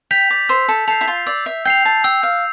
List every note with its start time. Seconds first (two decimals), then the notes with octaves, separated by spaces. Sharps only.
0.11 G5 G6 B6 F7
0.30 D5
0.49 C5 E6
0.68 A4
0.88 A4 G6 C7 F7
1.01 E4
1.08 F4
1.26 D5 E6
1.46 E5
1.65 G5 G6 C7 F7
1.85 A5
2.04 G5 E6
2.23 F5